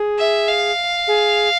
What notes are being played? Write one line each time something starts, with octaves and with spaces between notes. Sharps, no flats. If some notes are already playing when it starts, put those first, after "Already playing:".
Already playing: G#4
E5
F5
G#4